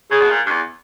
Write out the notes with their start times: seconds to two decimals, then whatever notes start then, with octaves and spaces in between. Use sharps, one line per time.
0.11 C#3 G#4
0.21 B2
0.31 A#2
0.46 G2
0.51 E2